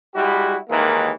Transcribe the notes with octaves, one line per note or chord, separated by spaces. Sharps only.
G3 G#3 E4 F#4 G4
D#2 D#3 E3 G#3 A#3